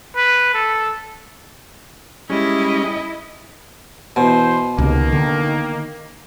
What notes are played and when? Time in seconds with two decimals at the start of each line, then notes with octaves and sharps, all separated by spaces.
0.16 B4
0.54 A4
2.30 G3 G#3 C#4 E4 D#5
4.16 B2 E3 C5
4.78 C#2 C3 D#3 A#3
5.12 D3